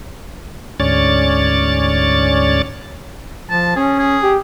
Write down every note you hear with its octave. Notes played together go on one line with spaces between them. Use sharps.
D2 G#2 C#4 C#5 D5 A6
F3 A5
C#4 G#4
G#4
G4